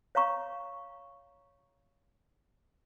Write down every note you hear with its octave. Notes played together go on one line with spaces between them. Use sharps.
C#5 F5 A#5 C#6